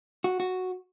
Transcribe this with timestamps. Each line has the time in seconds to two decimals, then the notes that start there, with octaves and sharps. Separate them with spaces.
0.24 F#4
0.40 F#4